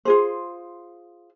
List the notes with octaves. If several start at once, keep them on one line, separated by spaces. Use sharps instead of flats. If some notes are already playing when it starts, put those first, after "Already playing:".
F4 G#4 C5